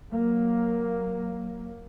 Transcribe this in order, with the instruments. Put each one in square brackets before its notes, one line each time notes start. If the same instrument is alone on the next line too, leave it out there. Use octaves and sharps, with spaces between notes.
[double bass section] F#3 A#3